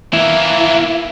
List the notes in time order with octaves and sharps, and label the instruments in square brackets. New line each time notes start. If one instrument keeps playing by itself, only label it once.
[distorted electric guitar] E3 A#3 [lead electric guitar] E4